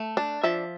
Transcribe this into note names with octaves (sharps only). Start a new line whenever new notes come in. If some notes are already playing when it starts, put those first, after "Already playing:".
Already playing: A3
D4
F3 E5